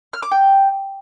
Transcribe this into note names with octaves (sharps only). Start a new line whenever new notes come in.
F6
D6
G5